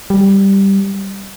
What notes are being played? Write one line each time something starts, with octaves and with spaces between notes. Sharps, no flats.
G3